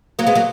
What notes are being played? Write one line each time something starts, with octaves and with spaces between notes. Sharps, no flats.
F#3 A#3
G#3 B3
F#3 A#3